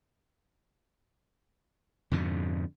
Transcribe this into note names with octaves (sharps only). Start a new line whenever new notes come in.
F2 G#2 B2 D3